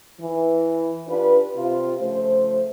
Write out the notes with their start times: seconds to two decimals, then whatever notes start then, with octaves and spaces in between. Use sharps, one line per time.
0.20 E3
1.08 D4 F4 G4 B4
1.56 C3 F4
2.01 C#3 F3 A3 C5